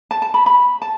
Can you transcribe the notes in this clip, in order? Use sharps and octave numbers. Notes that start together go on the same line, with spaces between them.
A5
A5
B5
B5
A5